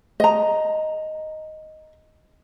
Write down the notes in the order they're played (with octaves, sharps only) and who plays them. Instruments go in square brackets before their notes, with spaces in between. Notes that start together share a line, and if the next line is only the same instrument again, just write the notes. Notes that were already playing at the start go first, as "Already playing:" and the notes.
[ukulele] D#5 A#5